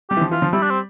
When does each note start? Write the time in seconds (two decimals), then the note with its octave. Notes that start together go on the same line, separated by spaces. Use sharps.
0.10 G3 G4
0.17 E3
0.21 F3
0.31 E3 F4
0.42 F3
0.53 G3 E4
0.62 D4
0.70 C4